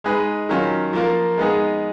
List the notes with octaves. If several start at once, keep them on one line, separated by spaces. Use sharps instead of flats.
G#3 D#4 G#4 B4
D#3 F#3 C#4 F4
F3 A#3 F4 A#4
G#3 B3 D#4 G#4